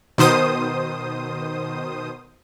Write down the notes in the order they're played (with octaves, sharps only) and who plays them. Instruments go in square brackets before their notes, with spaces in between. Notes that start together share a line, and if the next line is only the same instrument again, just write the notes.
[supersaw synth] B2 D#3 C5 D#6